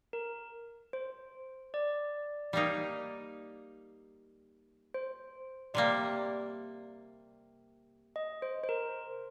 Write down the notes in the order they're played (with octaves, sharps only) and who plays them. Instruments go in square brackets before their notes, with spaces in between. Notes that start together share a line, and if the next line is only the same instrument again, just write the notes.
[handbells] A#4
C5
D5
[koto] G3 A#3 D#4
[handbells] C5
[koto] C3 G3 A#3 [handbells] D5
[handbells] D#5
C5
C5
A#4